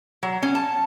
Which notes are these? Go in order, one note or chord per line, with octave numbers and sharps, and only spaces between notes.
F#3
C#4
A5